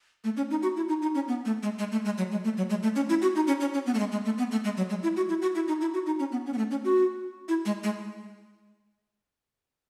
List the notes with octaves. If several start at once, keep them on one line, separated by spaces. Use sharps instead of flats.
A3
C#4
D#4
F#4
E4
D#4
D#4
C#4
B3
A3
G#3
G#3
A3
G#3
F#3
G#3
A3
F#3
G#3
A3
C#4
E4
F#4
D#4
C#4
C#4
C#4
B3
A3
G#3
G#3
A3
B3
A3
G#3
F#3
G#3
E4
F#4
E4
F#4
E4
D#4
E4
F#4
D#4
C#4
B3
C#4
B3
A3
C#4
F#4
E4
G#3
G#3